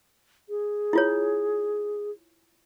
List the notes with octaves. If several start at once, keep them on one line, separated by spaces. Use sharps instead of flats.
G#4
E4 F4 C#5